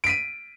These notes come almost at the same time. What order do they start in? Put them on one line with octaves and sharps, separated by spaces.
D7 B6 D#7